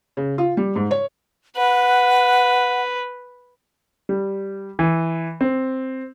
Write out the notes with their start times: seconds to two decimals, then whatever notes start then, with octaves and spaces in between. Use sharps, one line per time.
0.17 C#3
0.38 F4
0.57 G3
0.76 G#2
0.91 C#5
1.57 B4 F#5
4.09 G3
4.79 E3
5.41 C4